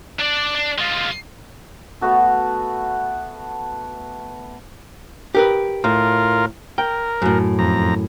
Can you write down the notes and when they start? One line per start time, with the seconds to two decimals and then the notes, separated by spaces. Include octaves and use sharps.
0.20 D4 D5
0.55 D4
0.78 G#3 F4
2.01 A3 B3 F#4 A4
5.35 G4 A#4 B4
5.84 A2 F4 A#4
6.78 A#4 G5
7.22 F#2 A2
7.59 F2 A#5